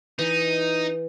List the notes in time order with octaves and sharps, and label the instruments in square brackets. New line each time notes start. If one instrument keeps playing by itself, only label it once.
[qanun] E3 [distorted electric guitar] D#4